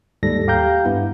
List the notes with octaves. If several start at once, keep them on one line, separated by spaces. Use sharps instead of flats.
D#2 G#2 G3 A4 A#6
G4 F5 G5 A#5 G6
G2 B3 E4